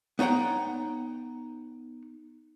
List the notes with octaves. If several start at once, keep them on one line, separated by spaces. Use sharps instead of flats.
B3 D#4 C#5 F#5 G5